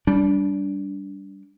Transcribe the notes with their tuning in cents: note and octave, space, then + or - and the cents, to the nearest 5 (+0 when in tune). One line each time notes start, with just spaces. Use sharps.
G3 +0 D4 -25